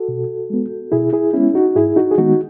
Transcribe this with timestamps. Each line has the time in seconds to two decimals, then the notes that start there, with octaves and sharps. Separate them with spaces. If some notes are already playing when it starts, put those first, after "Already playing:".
Already playing: F#4 A4
0.08 B2
0.50 G#3 B3
0.92 B2 E4 G#4
1.13 E4 G#4
1.33 G#3 B3 C#4 E4
1.54 D#4 F#4
1.75 G#2 E4 G#4
1.96 D#4 F#4
2.11 G#4
2.18 D#3 G#3 B3 D#4 F#4